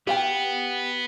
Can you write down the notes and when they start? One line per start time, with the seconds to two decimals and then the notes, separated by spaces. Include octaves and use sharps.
0.07 B3 G4 F5 G5